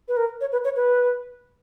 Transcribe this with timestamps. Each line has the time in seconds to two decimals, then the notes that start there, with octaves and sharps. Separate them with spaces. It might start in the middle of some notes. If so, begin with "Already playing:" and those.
0.08 B4
0.17 A#4
0.41 C#5
0.52 B4
0.64 C#5
0.76 B4